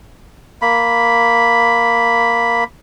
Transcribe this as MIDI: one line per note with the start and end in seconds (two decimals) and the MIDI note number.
0.62 2.64 58
0.62 2.64 83